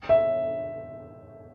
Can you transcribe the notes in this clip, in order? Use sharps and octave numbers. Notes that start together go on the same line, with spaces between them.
E5